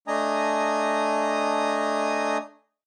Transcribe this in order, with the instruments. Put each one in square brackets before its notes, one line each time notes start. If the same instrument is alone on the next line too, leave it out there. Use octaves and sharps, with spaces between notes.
[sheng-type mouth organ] A3 D4 D#5 G#5 A#5 D#6